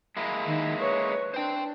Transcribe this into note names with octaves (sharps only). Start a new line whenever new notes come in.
G#3 A#3 E4
D#3
B4 C#5
D4 C5 G5